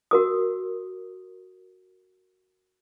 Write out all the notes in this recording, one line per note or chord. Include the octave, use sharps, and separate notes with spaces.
F#4 A#4 D#6